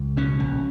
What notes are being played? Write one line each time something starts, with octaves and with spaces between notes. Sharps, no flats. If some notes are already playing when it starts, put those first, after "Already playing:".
Already playing: C#2
B2 C#4
A#1